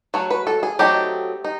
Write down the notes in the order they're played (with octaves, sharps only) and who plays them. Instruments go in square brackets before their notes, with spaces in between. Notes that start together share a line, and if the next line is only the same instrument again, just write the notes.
[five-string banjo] F#3 A3 C#5
B4
A4
G#4
F#3 A3 C4 D#4 G4
D#4